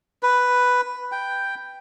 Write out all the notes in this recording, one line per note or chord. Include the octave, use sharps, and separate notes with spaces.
B4
G5